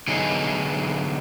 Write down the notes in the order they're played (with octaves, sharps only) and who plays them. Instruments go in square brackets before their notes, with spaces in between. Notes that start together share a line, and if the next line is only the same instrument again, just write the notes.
[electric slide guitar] D3 F#3 B3 D#4 G#4